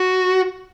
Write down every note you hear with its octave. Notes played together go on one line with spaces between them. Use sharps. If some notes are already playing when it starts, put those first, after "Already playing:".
Already playing: F#4